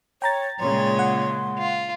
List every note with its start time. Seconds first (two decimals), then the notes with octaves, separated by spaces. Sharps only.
0.22 C#5 G5 A#5 A6
0.60 A#2 C#3 G#3 C#5 C6
0.99 F#5
1.58 F4